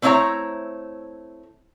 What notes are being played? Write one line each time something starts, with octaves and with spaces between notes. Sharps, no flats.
A3 C4 D4 E4 C#5 A#5